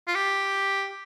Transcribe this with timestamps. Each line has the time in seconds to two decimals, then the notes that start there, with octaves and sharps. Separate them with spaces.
0.07 F4
0.15 G4